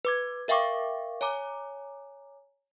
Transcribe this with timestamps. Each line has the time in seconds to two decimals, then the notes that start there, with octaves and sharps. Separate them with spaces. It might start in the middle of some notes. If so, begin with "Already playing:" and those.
0.05 B4 D6 G#6
0.48 A#4 E5 F5 G5 C#6 D6
1.21 C#5 G#5 A#5 D6